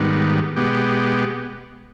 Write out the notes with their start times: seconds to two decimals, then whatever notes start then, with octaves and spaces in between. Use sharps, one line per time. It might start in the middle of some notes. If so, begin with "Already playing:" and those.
Already playing: G#2 D#3 G3 B3
0.56 B2 G#3 B3 G4